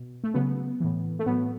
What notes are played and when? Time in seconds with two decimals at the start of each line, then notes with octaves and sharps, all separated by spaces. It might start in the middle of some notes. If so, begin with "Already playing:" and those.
Already playing: B2
0.24 A3
0.34 C#3 F#3 B3
0.80 A2 E3
1.19 A3
1.26 A2 F#3 B3